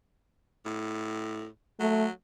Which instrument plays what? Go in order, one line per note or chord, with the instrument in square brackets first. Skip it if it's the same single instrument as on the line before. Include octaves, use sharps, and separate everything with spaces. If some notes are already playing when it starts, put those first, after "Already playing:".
[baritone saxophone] A2
[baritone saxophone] F#3 [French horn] A3